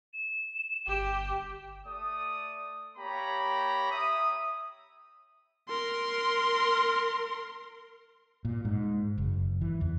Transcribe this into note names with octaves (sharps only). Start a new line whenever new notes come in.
E7
G1 G4
A3 D5 D#6
A#3 G4 C#5 A#5 B5
E5 D#6
A#4 C6
A#2
G#2
F#1
E3
E2